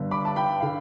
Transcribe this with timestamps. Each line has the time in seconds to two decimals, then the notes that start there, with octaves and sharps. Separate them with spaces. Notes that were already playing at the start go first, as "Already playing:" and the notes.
Already playing: G1 G2 D3
0.11 B5 D6
0.25 A5
0.36 G5 B5
0.60 D3 F5